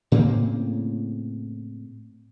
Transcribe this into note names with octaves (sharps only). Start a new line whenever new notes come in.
A2 C#3 A#3 C4